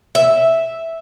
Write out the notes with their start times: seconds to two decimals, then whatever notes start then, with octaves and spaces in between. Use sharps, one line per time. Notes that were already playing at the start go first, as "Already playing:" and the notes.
0.15 E5